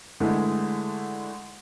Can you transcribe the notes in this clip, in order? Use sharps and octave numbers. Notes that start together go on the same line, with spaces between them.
D3 E3 G#3 A3